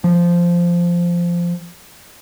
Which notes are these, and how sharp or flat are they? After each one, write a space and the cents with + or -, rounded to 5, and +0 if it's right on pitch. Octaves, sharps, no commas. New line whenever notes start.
F3 -10